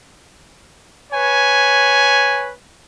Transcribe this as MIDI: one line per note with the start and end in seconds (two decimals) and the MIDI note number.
1.12 2.52 71
1.12 2.52 73
1.12 2.52 80